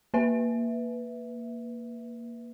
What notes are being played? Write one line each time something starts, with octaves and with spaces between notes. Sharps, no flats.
A#3 B4 E5